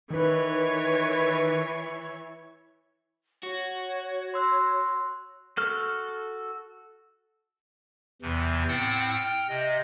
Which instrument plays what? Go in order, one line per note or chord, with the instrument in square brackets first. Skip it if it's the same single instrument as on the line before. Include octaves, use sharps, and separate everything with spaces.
[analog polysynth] D#3 B4 [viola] E3 C#5
[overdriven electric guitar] F#4 [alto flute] C#5
[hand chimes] C6 E6 F#6
[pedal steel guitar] F#4 A4 F6
[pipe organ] E2 C3 E3
A2 C4 F#5 G5 E6 A6
G5 F6
C3 D#5